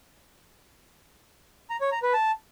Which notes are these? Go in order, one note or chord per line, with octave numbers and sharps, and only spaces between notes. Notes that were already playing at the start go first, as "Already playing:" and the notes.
A#5
C#5
A#5
B4
A5